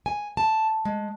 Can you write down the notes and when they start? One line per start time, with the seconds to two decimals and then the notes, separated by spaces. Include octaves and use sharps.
0.06 G#5
0.37 A5
0.85 G#3